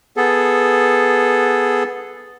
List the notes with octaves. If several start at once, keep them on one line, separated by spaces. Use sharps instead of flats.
B3 G#4 A4